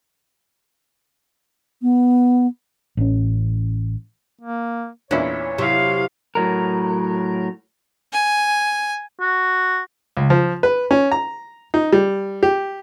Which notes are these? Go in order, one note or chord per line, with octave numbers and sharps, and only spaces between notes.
B3
A1 C#4
A#3
E2 A#2 C#4 D4 E4 C#5
C3 F#3 E4 F5
A2 F#3 A#4
G#5
F#4
C#2
F3
B4
C#4
A#5
D#4
G3
G4